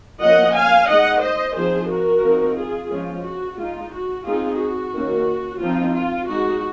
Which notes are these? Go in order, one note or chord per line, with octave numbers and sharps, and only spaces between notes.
F3 A#3 C#4 D#5 F#5
F5 G#5
G#3 D#4 D#5 F#5
C5 D#5
F3 C4 D#4 G#4 C5
F#4 A#4
F3 C4 D#4
F4 G#4
F3 G#3 C#4 F4
F#4
G#3 D#4 F4
F#4
G#3 C4 D#4 F4 G#4
F#4
D#3 A#3 C#4
F3 C4 D#4 F4
F4
G#3 D#4 F#4